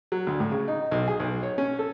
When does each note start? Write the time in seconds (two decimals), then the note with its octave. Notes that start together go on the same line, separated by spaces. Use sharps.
0.12 F#3
0.27 D2
0.40 A2
0.52 C#3
0.68 D#4
0.91 B1
1.08 G#4
1.20 B1
1.43 C#5
1.58 C#4
1.79 A4